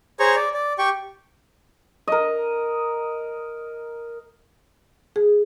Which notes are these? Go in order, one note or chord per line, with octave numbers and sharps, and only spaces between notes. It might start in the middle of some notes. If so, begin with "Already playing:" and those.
G#4 C5 C#5 A#5 C#6
D5
D5
G4 G5 C#6
A#4 D#5
G#4